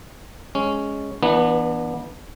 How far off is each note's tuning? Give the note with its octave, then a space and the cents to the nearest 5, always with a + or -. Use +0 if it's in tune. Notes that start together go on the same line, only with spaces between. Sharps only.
G#3 +0 C#4 +0
E3 +0 B3 -25 D4 +20